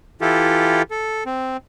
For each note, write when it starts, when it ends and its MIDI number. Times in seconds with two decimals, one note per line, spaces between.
0.21 0.82 52
0.21 0.82 64
0.21 0.82 65
0.21 0.82 67
0.21 0.82 69
0.91 1.24 69
1.26 1.57 60